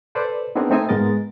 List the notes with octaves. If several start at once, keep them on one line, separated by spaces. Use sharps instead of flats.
A4 B4 C5 D5
B3 C4 D4 D#4 G#4 A#4
A3 C4 D#4 E5 G#5 D#6
G#2 G#3 B3 A#4 D#5 A6